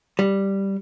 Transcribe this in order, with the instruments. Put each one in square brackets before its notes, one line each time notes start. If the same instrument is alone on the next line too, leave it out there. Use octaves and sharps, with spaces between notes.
[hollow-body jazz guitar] G3